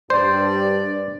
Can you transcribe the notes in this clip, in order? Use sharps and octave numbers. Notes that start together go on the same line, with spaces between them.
G2 C5 D5